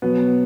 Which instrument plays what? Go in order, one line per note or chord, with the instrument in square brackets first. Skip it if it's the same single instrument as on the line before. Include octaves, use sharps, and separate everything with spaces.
[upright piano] B2 F#3 B3